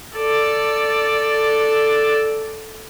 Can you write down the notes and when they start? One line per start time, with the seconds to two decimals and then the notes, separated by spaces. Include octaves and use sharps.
0.17 A4 D5